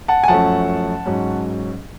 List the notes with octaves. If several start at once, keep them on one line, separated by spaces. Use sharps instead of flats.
F#5 A5
G#5
F#2 F3 A3 C#4 F#5 A5
G#2 F#3 C#4